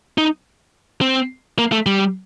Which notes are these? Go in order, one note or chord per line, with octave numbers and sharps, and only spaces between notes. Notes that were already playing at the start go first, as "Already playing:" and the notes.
D#4
C4
A#3
A3
G3